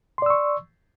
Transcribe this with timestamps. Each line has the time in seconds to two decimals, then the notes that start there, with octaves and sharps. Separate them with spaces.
0.18 C6
0.22 D5
0.26 E6
0.30 C#6